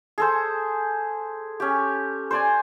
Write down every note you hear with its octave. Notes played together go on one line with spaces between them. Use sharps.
G#4 A4 C5
C#4 G4
C5 D5 G#5